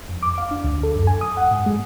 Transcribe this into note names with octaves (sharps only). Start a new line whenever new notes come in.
F2
D6
F5
D4
D2
A4
F#2
G#5
D#6
F#5
G#2
G#3